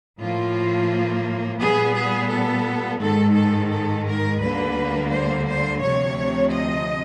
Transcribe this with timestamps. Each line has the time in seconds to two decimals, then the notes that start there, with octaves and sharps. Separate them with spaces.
0.19 A2 F3 A#3 F4
1.60 A#2 G3 B3 G#4
1.95 G#4
2.30 A4
3.00 G#2 D#3 G#3 A4
3.35 A4
3.71 A4
4.06 A#4
4.40 D2 D3 G3 A#3 B4
5.11 C5
5.47 C5
5.81 D2 C3 F3 C#5
6.51 D#5